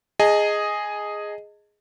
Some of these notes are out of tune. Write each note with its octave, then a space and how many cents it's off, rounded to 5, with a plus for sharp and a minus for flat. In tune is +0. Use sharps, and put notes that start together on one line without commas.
G#4 +0 D#5 +0 A5 +35